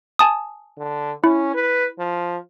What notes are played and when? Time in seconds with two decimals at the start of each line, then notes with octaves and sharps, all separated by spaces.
0.19 G#5 A5 D#6
0.78 D3
1.24 C#4 E4
1.54 B4
1.99 F3